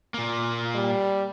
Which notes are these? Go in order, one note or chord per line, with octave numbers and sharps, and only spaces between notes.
A#2 A#3
G3